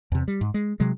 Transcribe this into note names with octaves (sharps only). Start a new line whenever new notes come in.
E2 C3
G3
G#2
G#3
C3 F#3 G#3